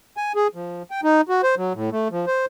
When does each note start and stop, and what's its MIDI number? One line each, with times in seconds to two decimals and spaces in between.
0.17 0.32 80
0.35 0.48 68
0.55 0.83 53
0.91 1.01 79
1.03 1.21 63
1.29 1.42 66
1.43 1.55 72
1.57 1.73 54
1.74 1.90 45
1.92 2.08 57
2.11 2.26 53
2.27 2.46 72